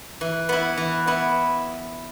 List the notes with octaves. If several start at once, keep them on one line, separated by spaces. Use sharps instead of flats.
E3
B3 E4
E3
B3 E4